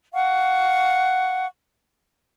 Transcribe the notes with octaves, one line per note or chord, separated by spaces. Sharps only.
F5 F#5 C#6